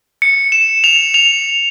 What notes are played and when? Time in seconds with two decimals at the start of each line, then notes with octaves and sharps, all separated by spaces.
0.22 C#7
0.52 E7
0.84 F7
1.14 F7